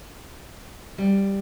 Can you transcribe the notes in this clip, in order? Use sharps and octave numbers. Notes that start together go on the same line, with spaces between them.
G3